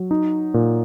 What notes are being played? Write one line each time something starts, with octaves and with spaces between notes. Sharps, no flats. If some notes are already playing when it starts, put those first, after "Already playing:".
Already playing: F#3
D#4
A#2